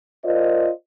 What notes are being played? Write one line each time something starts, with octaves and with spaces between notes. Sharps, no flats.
F4 A#4 C5 D5 D#5